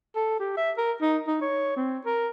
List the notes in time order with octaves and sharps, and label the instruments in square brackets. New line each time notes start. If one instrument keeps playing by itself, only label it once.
[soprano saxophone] A4
G4
E5
A#4
D#4
D#4
C#5
C4
A#4